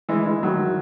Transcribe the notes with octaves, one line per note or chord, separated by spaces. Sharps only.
E3 G#3
E3 G#3
D#3 F#3